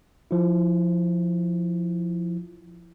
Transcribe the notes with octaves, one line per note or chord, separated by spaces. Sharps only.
F3 E4